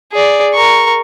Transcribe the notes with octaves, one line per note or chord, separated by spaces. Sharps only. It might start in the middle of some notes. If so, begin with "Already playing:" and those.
G#4 D5
A#4 C#6